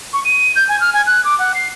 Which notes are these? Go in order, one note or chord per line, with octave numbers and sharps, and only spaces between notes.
C#6
D#7
G6
G#5
F6
G#5
F#6
D6
F#5
C7